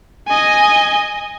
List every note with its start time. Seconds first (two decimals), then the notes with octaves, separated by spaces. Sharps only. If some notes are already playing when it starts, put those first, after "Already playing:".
0.28 D#5 G#5